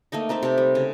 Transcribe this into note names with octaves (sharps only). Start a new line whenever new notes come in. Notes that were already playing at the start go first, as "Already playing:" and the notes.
A3 A#3 D#4 D#5
C4 D#4 A4 E5
C3 A5
G3
C#3